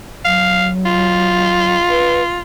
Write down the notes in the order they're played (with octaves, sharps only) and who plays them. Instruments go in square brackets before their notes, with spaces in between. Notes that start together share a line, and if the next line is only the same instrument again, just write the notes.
[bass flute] F#3 [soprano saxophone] F5
[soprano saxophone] F4
[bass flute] B4